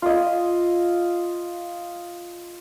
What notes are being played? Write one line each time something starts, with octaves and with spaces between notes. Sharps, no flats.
F4 D#5